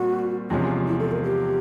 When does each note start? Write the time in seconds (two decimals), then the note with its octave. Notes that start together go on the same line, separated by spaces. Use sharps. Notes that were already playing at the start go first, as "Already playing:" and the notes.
Already playing: A#2 G3 C4 F#4
0.50 E2 C3 F3 G#3 C#4 F4
0.87 E4
1.00 A4
1.11 A#4
1.23 G4